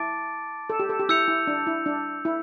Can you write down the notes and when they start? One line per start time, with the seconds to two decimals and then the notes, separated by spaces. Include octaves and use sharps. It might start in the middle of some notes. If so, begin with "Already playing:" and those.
Already playing: E4 A5 D6 A6 D7
0.70 A4
0.80 G4
0.89 A4
0.99 G4
1.09 E4 E6 G6 C#7 F7
1.28 E4
1.47 D4
1.67 E4
1.86 D4
2.25 E4